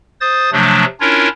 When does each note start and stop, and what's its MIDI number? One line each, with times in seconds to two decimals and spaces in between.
0.21 0.50 72
0.21 0.50 87
0.21 0.50 93
0.52 0.85 48
0.52 0.85 53
0.52 0.85 54
0.52 0.85 57
0.52 0.85 62
1.00 1.28 61
1.00 1.28 62
1.00 1.28 64
1.00 1.28 65
1.00 1.28 70
1.00 1.28 73